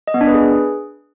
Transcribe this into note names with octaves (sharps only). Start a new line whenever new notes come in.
D#5
B3
D4
B4
G#4